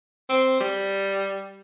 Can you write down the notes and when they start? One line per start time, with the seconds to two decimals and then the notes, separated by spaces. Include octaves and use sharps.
0.30 C4
0.61 G3